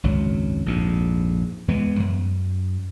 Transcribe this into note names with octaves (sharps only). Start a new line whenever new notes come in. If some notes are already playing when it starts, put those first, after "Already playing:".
G#1 C#2 F#2 F#3
A#1 F2 G#2
E2 E3 G#3 B3
F#2